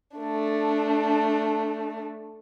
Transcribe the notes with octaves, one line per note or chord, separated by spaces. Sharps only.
A3 D4